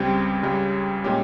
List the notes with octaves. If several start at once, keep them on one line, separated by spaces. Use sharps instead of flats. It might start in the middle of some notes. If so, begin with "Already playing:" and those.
Already playing: C#2 C#3 G3 C4 G4
C#2 C#3 G3 C#4 G4
A#2 G#3 C#4 G4